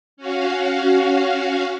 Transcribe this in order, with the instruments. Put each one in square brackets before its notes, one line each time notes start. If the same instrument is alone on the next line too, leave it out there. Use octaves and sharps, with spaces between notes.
[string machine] C#4 F#4 F5